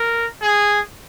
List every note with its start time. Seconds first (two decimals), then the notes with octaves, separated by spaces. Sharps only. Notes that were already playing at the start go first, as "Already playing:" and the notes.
Already playing: A#4
0.42 G#4